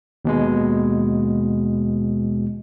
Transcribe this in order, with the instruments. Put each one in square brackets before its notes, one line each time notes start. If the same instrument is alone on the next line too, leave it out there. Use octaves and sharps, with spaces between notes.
[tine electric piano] D#2 B2 G#3